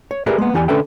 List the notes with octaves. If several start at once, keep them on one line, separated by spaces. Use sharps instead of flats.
C#5
G4 G#4 A#4 B4 D5 E5
G#3 A#3 B3
E2 E3 G4 D5 G#5
D3 C#4 A4 B4 E5 G5